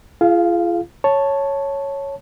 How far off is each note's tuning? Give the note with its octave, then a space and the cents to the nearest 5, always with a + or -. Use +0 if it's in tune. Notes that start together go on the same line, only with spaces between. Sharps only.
F4 -35 G#4 +20 F5 +0
C#5 +0 A5 +0